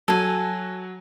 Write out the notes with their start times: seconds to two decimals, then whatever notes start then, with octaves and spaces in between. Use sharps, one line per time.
0.08 F#3 F#4 A4 G#5